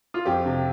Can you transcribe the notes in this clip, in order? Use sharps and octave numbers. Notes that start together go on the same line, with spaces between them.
F4
F2 G4
C3